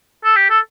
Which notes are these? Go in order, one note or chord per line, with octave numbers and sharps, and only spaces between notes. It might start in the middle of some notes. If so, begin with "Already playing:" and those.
A4
G4
A4